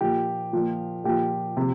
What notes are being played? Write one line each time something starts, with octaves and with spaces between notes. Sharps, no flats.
A#2 F3 G4
A#2 F3
A#2 F3 G4
C3 F3